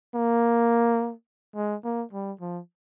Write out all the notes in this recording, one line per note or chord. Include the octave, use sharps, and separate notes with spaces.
A#3
G#3
A#3
G3
F3